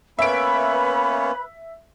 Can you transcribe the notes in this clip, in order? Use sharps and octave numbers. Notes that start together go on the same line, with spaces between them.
A#3 B3 C#4 B4 E5 B5 D7